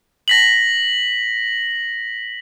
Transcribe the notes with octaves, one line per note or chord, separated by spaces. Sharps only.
A#6 B6 F#7